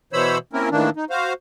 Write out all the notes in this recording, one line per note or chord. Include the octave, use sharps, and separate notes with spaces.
B2 E3 C5 C#5 B5 E6
A#3 C4 C#4 E4 A#4
A2 D#3 E3 A#3 D4
D#4
F#4 C5 F5